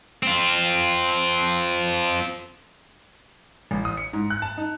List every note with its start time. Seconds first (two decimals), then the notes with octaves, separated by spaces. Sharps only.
0.23 C4 F4
3.71 A1
3.85 D#6
3.97 C#7
4.13 G#2
4.30 F#6
4.42 A5
4.58 D#4